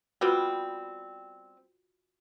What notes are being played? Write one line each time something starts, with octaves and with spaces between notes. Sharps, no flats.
G3 B3 C4 F4 F#4